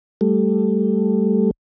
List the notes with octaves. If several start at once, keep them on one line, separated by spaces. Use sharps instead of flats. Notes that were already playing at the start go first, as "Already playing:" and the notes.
G3 A3